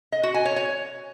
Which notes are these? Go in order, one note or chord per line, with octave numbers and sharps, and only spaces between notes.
D#5
F#4
G#5
C#5
C#5